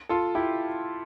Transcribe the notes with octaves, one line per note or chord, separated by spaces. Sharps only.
F4 A4
E4 G4